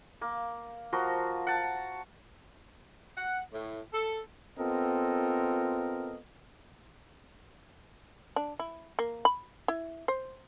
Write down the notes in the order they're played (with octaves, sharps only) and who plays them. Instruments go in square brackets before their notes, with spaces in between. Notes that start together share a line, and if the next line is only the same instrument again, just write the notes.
[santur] A#3
F3 F#4 A#4 C6
F#5 A5
[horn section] F#5
A2
A4
B3 C4 F4 A4 A#4 D#5
[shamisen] D4
E4
A#3
B5
E4
C5